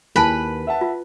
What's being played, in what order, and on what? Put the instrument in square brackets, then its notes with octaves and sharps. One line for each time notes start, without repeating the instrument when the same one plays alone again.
[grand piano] D#2 [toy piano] E4 G#5 A5 [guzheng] B4 B5
[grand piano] E5 F#5 A5
[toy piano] F4